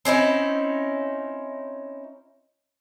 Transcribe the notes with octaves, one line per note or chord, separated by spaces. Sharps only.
C4 C#4 D#4 E4